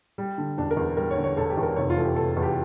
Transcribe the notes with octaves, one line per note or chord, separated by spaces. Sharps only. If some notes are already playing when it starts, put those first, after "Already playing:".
G3
D3
E1 D4
A#4
E2
G3 A#4
C#5
D3
C#5
E1 A4
G4
E2
A#4
F1 C#5
F4
E3 A4
G4
F1 A4
E2
G4